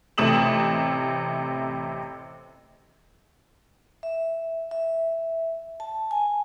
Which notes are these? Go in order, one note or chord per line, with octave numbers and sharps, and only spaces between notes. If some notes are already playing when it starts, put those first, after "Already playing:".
A1 C3 A3 D#6 E7 F#7
E5
E5
A5
G#5